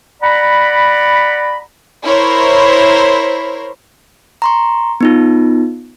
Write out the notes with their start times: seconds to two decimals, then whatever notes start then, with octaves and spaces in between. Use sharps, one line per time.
0.22 D5 F#5 A#5 B5
2.04 E4 A#4 C5 C#5
4.42 A#5 C6 C#6
5.01 B3 D#4 F4